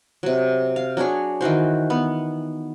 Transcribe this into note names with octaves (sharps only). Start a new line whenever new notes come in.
C3 F#3
F5
F#3 D4 G#4 C#5
D#3 E3 F#4 C5
B3